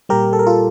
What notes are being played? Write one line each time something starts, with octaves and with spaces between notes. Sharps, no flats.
A#2 G3 G4 A#4
A4
A#4
F4 A4